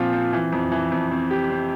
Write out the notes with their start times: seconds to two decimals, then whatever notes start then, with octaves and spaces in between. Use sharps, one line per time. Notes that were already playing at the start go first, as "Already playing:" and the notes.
Already playing: A#2 F3 C4 F4
0.13 C4
0.33 E3
0.52 F2
0.72 E3
0.92 F2
1.11 C4
1.31 G4
1.50 C4